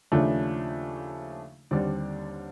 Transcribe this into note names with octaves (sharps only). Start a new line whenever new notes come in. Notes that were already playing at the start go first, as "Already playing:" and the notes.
D#2 C#3 F3 A3 D4
D#2 D3 G3 C4 D4 D5